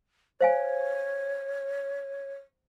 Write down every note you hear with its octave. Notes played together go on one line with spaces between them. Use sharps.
C5 C#5 F5 G#5